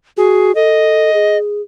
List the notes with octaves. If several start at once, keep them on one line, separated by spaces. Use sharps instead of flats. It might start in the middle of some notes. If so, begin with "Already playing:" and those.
F#4 G#4
A4 D#5
G#4